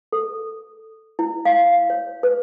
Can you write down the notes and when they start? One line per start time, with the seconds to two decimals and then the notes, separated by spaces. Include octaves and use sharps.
0.12 A4
1.19 E4
1.45 F5
1.90 C#5
2.23 B4